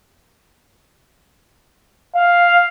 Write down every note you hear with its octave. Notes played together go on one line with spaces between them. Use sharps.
F5